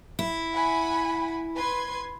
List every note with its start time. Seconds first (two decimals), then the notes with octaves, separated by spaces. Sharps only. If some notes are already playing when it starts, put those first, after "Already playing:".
0.19 E4
0.53 F#5 G#5 B5
1.56 B4 C6 G#6